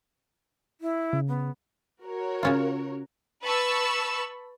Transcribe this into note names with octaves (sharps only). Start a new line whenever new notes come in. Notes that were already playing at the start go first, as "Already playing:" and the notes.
E4
C#3
B3
F#4 A#4 C#5
C#3 C#4 F4
B4 A5 B5 C#6 E6